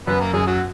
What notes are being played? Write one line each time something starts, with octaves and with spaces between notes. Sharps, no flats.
F#2 B3 B4
A#3 A#4
F#2 G#3 G#4
F#3 F#4